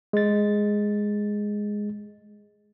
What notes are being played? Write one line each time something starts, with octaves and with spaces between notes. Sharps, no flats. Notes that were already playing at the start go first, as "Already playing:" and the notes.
G#3 A6